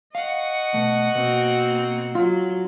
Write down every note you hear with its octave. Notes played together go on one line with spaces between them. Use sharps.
D#5 F5 F#5 C#6
B2 A3
B2 A#3 C4 F#4
F#3 F4